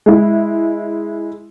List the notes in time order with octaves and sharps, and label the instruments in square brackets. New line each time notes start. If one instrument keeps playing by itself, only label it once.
[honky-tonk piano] G#3 E4